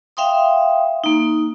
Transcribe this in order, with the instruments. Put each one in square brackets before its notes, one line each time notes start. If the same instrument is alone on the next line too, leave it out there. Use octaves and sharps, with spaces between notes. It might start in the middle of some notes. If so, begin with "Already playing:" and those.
[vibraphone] E5 F5 G5 C6 D#6
A#3 D#4